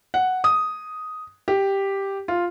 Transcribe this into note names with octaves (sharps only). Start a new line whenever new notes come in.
F#5
D#6
G4
F4